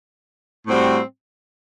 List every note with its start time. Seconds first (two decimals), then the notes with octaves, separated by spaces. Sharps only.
0.67 A2 G3 C4 F#4